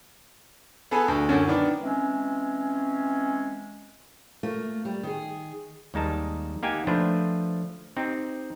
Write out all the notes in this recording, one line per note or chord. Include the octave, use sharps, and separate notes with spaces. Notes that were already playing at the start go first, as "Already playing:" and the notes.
B3 G#4 A4 B4 G#5 A5
D2
F#2 D3 C#4
D#3 B3 D4
E3 G#3 C4 C#4
A3 A#3 F4
G3
D#3 G#4
D#2 G3 G#3 D#4 A#4 A5
A#3 D#4 G4 F#5 G#5
F3 A3 D4 B4 C5
C4 D#4 G4